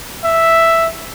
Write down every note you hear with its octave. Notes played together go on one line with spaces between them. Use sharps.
E5